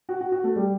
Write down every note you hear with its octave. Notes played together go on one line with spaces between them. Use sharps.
F#4
F#4
F#4
A3
G3